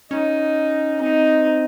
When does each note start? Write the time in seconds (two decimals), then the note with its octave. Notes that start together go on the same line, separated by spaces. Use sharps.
0.11 C#4 D#4
1.01 C4 D#4